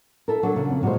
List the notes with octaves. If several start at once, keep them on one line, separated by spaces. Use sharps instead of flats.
E4 A4 A#4
F#3 D4 A4
C#3 F#3
F2
A#2 F#3 G#3 C5